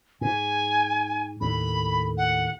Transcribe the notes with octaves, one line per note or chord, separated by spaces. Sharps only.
G#2 G#5
D#2 A2 B5
F#5